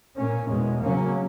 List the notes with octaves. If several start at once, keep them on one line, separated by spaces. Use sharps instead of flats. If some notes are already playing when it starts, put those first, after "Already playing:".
A#2 A#3 C#4
E2 B2 G#3
C#3 F#3 A#3 C#4